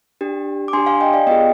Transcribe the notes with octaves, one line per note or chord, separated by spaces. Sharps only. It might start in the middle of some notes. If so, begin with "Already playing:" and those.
D4 G4
D6
D4 G4 G#5 C6
F5 G#5
D#5 G5
D5 F5
B3 F4 G#4 D#5 G5